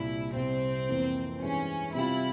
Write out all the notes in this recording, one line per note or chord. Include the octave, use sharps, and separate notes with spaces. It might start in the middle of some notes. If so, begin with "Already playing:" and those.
Already playing: C2 A#2 G3 E4
C2 C3 G3 C4
F2 E3 A#3
G2 E3 G#3 C#4
C3 G3 C4 E4 F4